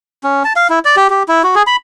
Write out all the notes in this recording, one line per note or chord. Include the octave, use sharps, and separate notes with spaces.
C#4
A5
F5
E4
D5
G4
G4
E4
F#4
G#4
B5